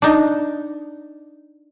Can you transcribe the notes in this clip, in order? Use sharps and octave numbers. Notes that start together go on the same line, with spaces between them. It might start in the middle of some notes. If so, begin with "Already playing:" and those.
D4 D#4